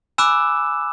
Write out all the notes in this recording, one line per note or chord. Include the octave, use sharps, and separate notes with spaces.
G#5 B5 D6 E6 F#6 E7